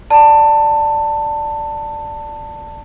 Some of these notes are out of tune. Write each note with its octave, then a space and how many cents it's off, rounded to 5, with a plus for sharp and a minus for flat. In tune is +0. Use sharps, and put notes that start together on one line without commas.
D5 +0 A5 +20